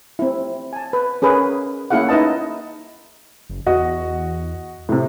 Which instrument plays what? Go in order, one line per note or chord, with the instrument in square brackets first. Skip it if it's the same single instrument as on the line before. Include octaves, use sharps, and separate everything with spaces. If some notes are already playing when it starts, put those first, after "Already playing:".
[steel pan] C4 E4
G#5 A5
B4
C#4 G#4 A#4 B4
A#3 C#4 E4 G#4 F5 F#5
D#4 E4 B4 D#5 A5
[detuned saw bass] F#1
[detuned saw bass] E2 [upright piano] F#4 D#5
[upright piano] A2 C3